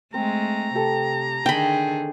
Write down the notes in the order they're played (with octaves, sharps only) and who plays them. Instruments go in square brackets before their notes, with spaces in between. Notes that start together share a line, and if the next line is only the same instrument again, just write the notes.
[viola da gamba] G#3 A3 [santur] C4 [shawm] A#5
[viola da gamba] C3 [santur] G4 A4
[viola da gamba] D3 D#3 G#4 [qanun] G5 B5